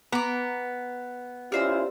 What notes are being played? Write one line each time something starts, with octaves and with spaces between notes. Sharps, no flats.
B3 A#5 D6
C#4 E4 F4 G4 A#4 C5 D5 E6